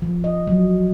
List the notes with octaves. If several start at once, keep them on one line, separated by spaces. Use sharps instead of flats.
F3
D#5
F#3